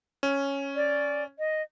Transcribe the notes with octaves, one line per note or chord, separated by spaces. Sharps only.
C#4
D5
D#5